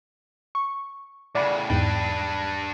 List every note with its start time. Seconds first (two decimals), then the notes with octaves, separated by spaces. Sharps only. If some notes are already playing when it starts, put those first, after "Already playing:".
0.55 C#6
1.35 A2 C#3 D5 F#5 B5
1.70 E2 G#2 D4 B4 G5